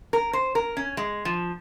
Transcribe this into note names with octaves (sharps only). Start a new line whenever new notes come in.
A#4
C5
A#4
C#4
G#3
F3